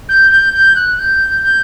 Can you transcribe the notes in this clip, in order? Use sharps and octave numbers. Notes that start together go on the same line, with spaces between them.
G6
G6
G6
F#6
G6
G6